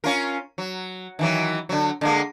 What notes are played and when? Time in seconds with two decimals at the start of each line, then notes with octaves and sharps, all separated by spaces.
0.04 C#4 F4 A#4
0.58 F#3
1.19 D#3 E3 F#3
1.69 D3 F#3
2.01 D3 G#3 A#3